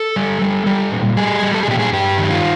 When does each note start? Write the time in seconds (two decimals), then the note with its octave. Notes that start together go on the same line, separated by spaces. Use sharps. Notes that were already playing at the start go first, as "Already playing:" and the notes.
Already playing: A4
0.16 G3
0.42 G3
0.66 G3
0.92 A#2
1.17 G3 G#4
1.42 G3
1.54 A4
1.63 G#4
1.68 A#2 G4
1.79 G#4
1.93 G2 G4
2.18 D#3
2.30 F4